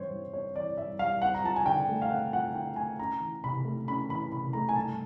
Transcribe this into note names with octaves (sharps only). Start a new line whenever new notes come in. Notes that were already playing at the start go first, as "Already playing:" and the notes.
Already playing: G2 E3 C4 C5 C#5
G3
C4 C#5
E3 D5
G2 E5
G3 F5
C4 F#5
A#5
F3 A5
G#5
D3 G5
A3
F5
C4 F#5
F3 F#5
D3 G5
A3 G#5
C#4 A#5
E3
C3 B5
A3
C#4 B5
E3 B5
C3 B5
A3 A#5
G#5
G2 A5